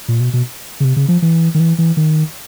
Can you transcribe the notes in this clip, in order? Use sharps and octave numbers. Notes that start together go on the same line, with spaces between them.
A#2
B2
B2
C#3
C3
C#3
F3
E3
D#3
E3
E3
D#3